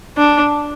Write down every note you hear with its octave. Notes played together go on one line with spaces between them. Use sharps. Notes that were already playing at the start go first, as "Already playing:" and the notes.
D4